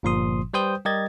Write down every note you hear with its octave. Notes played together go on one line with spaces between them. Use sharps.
G1 A#2 F3 C6 D#6
G3 B4 C5 G5 D#6 G6
G3 G4 A#4 D#5 G#6 A6